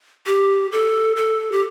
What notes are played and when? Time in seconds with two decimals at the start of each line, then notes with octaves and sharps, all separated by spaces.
0.26 G4
0.72 A4
1.16 A4
1.52 G4